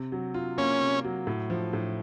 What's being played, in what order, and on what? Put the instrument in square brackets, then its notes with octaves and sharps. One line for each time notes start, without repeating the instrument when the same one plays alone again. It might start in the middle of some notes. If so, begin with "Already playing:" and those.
Already playing: [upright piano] C3
F#3
F4
[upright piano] A#3 [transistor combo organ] C#4
[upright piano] C3
F#3
A2
F3
A2